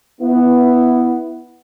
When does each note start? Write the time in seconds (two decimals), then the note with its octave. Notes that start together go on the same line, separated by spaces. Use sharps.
0.21 B3 E4